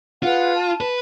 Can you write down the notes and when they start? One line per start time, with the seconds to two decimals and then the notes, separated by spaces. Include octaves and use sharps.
0.23 F4 G#4 B4 F#5
0.54 A5
0.81 B4